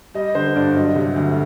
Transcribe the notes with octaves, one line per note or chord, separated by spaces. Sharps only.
G3 D#5
D3 C5
G2 D5
F#3 D#5
C3
D2